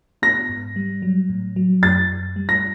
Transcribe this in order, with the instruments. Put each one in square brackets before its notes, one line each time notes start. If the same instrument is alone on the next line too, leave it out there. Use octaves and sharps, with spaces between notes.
[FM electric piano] B3 [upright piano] A#6
[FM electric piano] G#2
G3
F#3
A2
F#3
[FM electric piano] F#2 [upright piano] A6
[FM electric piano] F#2
G3
[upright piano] A#6